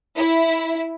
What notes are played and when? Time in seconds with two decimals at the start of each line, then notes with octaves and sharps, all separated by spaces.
0.17 E4